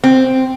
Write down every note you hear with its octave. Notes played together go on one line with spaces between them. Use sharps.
C4